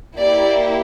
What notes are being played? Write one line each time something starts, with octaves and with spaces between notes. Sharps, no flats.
A#3 E4 G4 D5